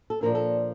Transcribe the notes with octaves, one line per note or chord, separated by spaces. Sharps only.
A4
A#2 F3 A#3 D4 A#4
A4